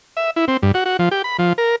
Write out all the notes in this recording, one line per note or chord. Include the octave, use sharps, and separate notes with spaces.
E5
E4
C4
G2
F#4
F#4
F3
G4
B5
F3
A#4